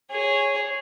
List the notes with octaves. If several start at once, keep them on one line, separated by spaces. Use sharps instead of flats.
G#4 C#5